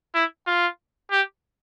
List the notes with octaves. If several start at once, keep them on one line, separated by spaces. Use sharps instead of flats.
E4
F4
G4